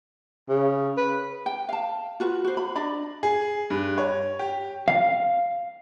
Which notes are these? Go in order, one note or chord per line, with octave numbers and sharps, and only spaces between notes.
C#3
B4
G5
F5 A5
F4 F#4 B4
F#4 C5
B5
D4 D5 D#5 B5
G#4
G2
C#5
G4
F5